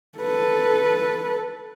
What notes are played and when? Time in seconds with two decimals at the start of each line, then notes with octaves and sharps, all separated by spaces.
0.19 A4 B4